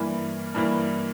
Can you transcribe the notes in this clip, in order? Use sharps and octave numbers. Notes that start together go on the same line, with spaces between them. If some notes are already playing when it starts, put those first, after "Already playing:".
Already playing: G2 E3 A#3
G2 E3 A#3